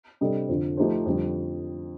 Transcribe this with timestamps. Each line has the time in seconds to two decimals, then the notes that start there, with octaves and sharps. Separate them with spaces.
0.21 C3 G3 D4 A4 D#5
0.49 F2 D3 F3
0.77 F3 A3 D#4 G4 C5
1.06 F2 D3 G3